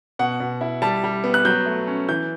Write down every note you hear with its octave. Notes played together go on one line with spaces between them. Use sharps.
B2 F#5
B2
E4
G3 A5
G3
B3
F#6
F#3 G6
A3
C#4
E3 G6